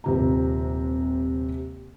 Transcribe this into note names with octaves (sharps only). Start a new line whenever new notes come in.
D#1 C3 A#5